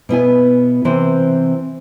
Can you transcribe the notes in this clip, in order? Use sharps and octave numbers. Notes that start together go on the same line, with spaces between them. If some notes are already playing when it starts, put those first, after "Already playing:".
B2 B3 E4 G#5
C3 E3 C4 B4 C5